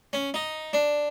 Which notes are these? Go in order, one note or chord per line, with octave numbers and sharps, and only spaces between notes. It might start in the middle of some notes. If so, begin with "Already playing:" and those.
C#4
D#4
D4